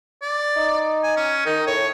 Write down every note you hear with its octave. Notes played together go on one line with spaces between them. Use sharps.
D5
D#4
G#5
C#4
D#3 D#4
A2 C#5